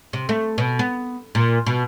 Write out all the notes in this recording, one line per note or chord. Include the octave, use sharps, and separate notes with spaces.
C3
A3
B2
B3
A#2
B2